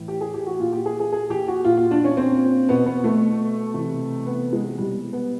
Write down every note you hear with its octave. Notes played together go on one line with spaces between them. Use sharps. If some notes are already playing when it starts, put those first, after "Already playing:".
Already playing: A2 E3
G4
G#4
G4
F#4
A#2 F4
G4
G#4
G#4
G#4
G4
F#4
A#2 F4
F4
D4
C#4
C4
B2 B3
B3
A3
C3 E3
B3
G#3
B2 G3
B3